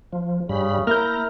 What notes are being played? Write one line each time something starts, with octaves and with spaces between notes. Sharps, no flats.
F3
G2 C#3 G3 B5
A#3 E4 A#4 A#5 F6 G6